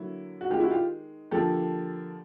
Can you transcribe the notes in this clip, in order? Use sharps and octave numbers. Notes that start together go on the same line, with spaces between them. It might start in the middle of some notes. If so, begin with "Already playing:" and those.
Already playing: D3 F#3 A#3 E4
F#4
D#3 G#3 F4 G4
E4 F#4
F4 G4
D3 F3 A#3 G4 A4